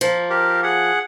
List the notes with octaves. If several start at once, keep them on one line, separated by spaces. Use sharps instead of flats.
F3 A#3
G4 A#4
G#4 F#5